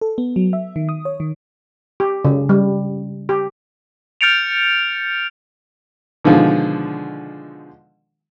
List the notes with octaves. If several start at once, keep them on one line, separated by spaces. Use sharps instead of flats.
A4
B3
F#3
E5
D#3
D#6
C#5
D#3
G4
C#3
G3
G4
F6 G6 A6 C#7 D7 F7
B2 D3 D#3 F3 G#3